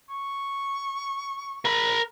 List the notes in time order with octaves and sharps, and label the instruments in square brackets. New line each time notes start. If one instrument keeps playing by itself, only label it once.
[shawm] C#6
[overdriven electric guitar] A#4 B5